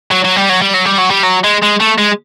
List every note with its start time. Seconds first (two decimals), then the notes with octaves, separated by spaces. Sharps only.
0.11 F#3
0.24 F#3
0.36 G3
0.49 F#3
0.62 G3
0.74 F#3
0.86 G3
0.99 F#3
1.11 G3
1.23 F#3
1.44 G#3
1.62 G#3
1.80 A3
1.98 G#3